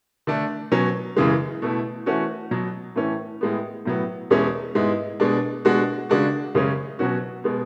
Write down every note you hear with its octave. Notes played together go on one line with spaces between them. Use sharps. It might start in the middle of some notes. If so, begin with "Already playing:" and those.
D3 A3 D4
B2 F#3 C#4
F#2 C#3 E3 G#3
B2 A3 E4
E3 A3 C#4 F#4
B2 F#3 B3
A2 E3 A3 C#4
A2 G#3 B3
A2 F#3 B3
E2 B2 G#3 C#4 E4
G#2 G#3 B3 E4
B2 G#3 D4
B2 G#3 D4 F#4
C#3 G#3 D4 F#4
F#2 C#3 G#3 C#4
B2 F#3 C#4 F#4
B2 G#3 B3